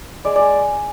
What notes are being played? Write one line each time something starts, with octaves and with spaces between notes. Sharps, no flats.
G#3 D5
G#3 D5